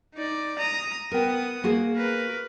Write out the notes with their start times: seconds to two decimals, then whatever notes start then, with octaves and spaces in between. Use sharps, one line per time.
0.15 D#4 D5
0.58 A#5 D#6
1.11 B3 A#4 G5 D#6
1.64 A#3 F#4 G#4
1.95 A#4 B4